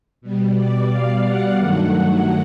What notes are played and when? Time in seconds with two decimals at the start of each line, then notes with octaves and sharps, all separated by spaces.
0.21 B2 G3
0.56 D5
0.90 F5
1.24 F#5
1.58 G2 D#3 F#3 A3 F#5